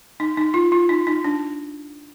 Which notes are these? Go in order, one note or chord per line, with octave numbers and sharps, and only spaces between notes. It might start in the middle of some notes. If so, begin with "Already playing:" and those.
D#4
D#4
F4
F4
D#4
D#4
D4